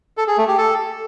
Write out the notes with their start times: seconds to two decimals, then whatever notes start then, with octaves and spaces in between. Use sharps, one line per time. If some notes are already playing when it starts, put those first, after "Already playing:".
0.17 A4
0.27 G#4
0.38 A3
0.48 G4
0.58 A4